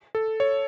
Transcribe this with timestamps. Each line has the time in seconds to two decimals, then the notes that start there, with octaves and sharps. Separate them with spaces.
0.15 A4
0.40 C#5